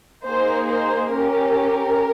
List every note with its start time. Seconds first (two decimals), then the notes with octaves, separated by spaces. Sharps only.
0.24 A#3 D#4 G#4 C5
0.68 C5
1.13 C#4 G4 A#4